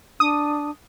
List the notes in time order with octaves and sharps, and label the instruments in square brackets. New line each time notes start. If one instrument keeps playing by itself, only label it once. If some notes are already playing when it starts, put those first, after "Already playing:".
[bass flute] D4 [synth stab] D#6